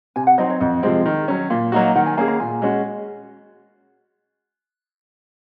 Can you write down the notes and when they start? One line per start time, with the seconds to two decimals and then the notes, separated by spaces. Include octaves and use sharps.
0.16 C3 G#5
0.27 F#5
0.38 F#3 C4 D#4 D#5
0.50 C#5
0.60 F2 D#5
0.83 C3 F3 G#3 C4
1.06 D#3
1.28 F#3 C#4
1.50 A#2 F5
1.72 F#3 A#3 D#4 F#4
1.84 F5
1.95 D#3 F#5
2.06 G#5
2.17 A#3 C#4 G#4 G#5
2.28 A#5
2.40 A#2 G#5
2.62 G#3 C#4 F#4